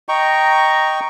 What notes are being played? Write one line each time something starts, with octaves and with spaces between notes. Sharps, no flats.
D#5 G5 A#5 C#6